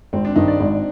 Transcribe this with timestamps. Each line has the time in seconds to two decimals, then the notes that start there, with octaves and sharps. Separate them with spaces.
0.13 G#1 C4
0.25 D4
0.36 G2 D#3 D#4
0.48 D5
0.60 G#1